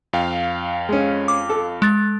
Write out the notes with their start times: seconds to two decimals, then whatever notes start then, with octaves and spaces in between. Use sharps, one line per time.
0.13 F2 F5 G5
0.89 G#3 C#4
1.28 D6
1.50 A4
1.82 G#3 A6